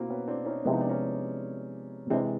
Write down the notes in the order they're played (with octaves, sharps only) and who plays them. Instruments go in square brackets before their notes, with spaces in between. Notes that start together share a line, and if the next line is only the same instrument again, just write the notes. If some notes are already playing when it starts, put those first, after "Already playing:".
Already playing: [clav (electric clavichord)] B2 [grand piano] A#3 C4 E4 F#4
[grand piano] B3 C#4
C4 D4
C#4 D#4
[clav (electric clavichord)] C3 F3 G#3 B3 [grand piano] E4
[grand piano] D#4
D4
C#4 D#4
[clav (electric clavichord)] C3 E3 G#3 [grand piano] C4 D4